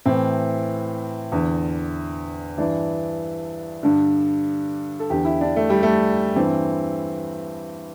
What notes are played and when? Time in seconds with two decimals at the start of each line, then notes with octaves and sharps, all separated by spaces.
0.05 A2 E3 C4
1.32 E2 D3
2.58 G2 E3 D4
3.83 G2 D3
5.00 A4
5.10 E2 D3 G4
5.25 E4
5.41 D4
5.56 A3
5.70 G3
5.83 A3
6.36 G2 E3 C4